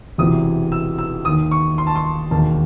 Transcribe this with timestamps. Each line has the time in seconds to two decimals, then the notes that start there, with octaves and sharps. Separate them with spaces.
0.18 E1 E2 C3 E3 D#6
0.72 E6
0.99 E6
1.25 D#2 D#3 D#6
1.51 C#6
1.78 C6
1.87 A5
1.96 C6
2.31 E1 D#2 D#3 A5